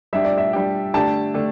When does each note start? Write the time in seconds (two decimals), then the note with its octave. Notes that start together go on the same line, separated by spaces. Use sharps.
0.13 G3 D4 G4 E5
0.25 D5
0.38 E5
0.53 G3 D4 G4
0.93 D3 A3 D4 G4 A5
1.34 D3 A3 D4 G4